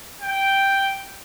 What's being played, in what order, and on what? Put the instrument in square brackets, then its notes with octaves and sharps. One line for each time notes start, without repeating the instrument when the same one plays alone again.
[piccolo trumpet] G5